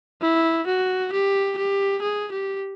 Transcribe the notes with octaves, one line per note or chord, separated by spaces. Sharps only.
E4
F#4
G4
G4
G#4
G4